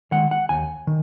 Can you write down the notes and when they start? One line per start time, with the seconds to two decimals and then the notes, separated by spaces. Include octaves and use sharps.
0.12 D#3 G#3 F#5
0.31 F#5
0.49 D#2 G#5
0.87 D#3